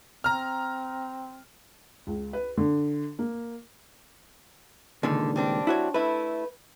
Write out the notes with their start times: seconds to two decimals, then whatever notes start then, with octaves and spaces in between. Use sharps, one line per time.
0.24 C4 A#5 F6
2.07 C#2
2.33 B4
2.57 D3
3.19 A#3
5.03 C#2 A#2 D3 D#3
5.36 G3 C4 D4
5.67 E4 F#4 C#5
5.94 A3 E4 B4